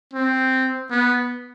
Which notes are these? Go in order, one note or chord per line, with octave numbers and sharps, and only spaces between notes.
C4
B3